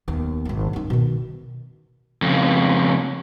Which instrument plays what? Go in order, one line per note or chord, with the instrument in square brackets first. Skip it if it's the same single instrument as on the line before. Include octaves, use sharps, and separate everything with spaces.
[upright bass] D#2 B3
G#1 D#3
F#2 D#4
B2 D#3
[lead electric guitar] F2 C#3